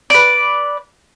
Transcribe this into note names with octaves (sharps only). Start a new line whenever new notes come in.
B4 D5